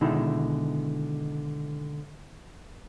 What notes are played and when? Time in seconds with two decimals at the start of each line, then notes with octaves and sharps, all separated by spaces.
0.01 B2 D3 D#3 G#3 D#4 E4